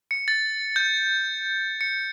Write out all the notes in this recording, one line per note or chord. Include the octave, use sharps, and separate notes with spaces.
C#7
A6
G6
C#7